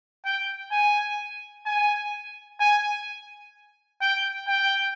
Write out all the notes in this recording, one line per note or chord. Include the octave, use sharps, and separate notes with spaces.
G5
G#5
G#5
G#5
G5
G5